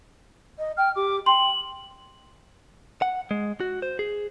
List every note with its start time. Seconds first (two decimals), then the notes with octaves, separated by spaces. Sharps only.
0.58 D#5
0.77 G5 F6
0.96 G4 D6
1.26 G5 C6 F#7
3.02 F#5
3.31 G#3
3.60 F#4
3.82 C5
3.99 G#4